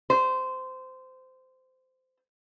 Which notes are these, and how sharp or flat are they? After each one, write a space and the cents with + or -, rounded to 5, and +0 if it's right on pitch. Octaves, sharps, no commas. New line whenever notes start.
C5 -20